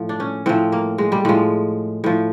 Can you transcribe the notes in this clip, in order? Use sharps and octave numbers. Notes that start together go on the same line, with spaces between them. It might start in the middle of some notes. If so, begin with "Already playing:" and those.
Already playing: A2 F3
D4
C#4
A2 F3 C4
A#3
G#3
G3
A2 F3 G#3
A2 F3